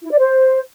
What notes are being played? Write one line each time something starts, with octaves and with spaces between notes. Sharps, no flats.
E4
D5
C5